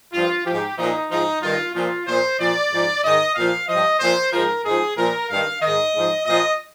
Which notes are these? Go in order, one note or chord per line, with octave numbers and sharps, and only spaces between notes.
G2 F3 F4
G#2 F3 G4
A#2 F3 D#4
G#2 F3 D#4
G2 D#3 F4
A#2 F3 F4
A#2 F3 C5
A#2 F3 D5
G#2 F3
G#2 D#3 D#5
A#2 F3 F5
G2 F3 D#5
A#2 F3 C5
G#2 F3 A#4
G#2 F3 G#4
A#2 F3 A#4
G2 D#3 F5
G#2 D#3 D#5
G#2 F3
A#2 F3 D#5